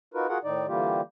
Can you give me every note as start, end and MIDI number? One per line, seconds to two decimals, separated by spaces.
0.14 0.27 63
0.14 0.27 65
0.14 0.27 66
0.14 0.27 70
0.14 0.27 71
0.28 0.38 65
0.28 0.38 66
0.28 0.38 68
0.28 0.38 70
0.28 0.38 78
0.44 0.66 45
0.44 0.66 51
0.44 0.66 63
0.44 0.66 74
0.67 1.01 50
0.67 1.01 52
0.67 1.01 55
0.67 1.01 58
0.67 1.01 65
0.67 1.01 67